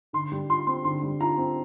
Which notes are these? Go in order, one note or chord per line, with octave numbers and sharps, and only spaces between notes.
D3 C6
G3
F4 C6
C4 C6
D3 C6
G3
F4 A#5
C4